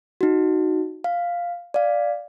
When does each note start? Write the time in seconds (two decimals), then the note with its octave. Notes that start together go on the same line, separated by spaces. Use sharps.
0.21 D#4 F#4
1.04 F5
1.74 D5 F5